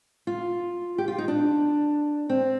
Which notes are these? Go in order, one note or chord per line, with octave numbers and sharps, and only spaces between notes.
F4
G4
F4
D#4
D4
C4